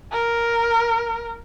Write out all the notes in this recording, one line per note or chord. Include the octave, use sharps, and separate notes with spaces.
A#4